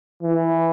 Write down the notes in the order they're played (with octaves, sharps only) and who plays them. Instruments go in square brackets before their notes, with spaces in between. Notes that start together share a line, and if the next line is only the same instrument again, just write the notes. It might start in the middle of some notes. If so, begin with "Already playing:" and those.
[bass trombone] E3